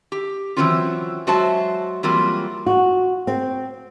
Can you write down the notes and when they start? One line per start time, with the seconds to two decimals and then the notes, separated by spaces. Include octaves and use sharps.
0.12 G4
0.57 E3 F#3 G3 C4 C#4 F4
1.27 F#3 G#3 F#4 C5 E5 A5
2.03 E3 F#3 G3 A#3 C4 F4
2.66 F#4
3.27 C4